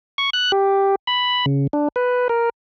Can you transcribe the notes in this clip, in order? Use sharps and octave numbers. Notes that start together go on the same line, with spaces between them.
C#6
F#6
G4
B5
C#3
D4
B4
A#4